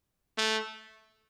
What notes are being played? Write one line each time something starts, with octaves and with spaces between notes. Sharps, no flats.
A3